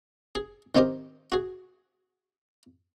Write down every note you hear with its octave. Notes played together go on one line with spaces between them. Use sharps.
G#4
D#3 C4 D#4 G4 A#4
F#4 G#4